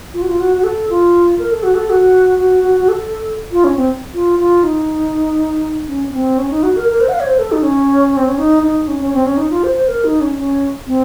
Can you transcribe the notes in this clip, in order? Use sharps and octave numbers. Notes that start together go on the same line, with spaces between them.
F4
F#4
F4
F#4
F#4
A4
F4
A#4
A4
F#4
A4
F#4
F#4
F#4
F#4
A4
F4
C#4
C4
F4
F4
D#4
C#4
C#4
C4
C#4
D#4
F#4
A#4
A#4
C5
F#5
F5
C#5
C5
A4
D#4
C#4
C4
C#4
D#4
D#4
C#4
C#4
C4
C#4
D#4
F4
C5
C5
A#4
D#4
C#4
C#4
C4